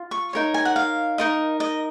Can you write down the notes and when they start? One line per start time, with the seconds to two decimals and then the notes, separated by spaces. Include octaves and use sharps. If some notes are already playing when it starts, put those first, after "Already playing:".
Already playing: F4
0.11 C#6
0.33 D#4 A#4 C#5
0.54 G#5
0.65 F#5
0.76 F5
1.18 D#4 A#4 D#5
1.60 D#5